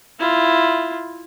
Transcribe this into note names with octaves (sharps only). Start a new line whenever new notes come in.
E4 F4